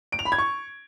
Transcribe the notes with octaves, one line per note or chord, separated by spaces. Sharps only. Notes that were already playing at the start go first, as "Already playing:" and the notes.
D7
F7
B5
G#6
C#6